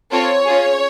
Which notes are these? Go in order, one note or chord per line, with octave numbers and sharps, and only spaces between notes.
C4 F4 A4 C#5
C#4 F4 G#4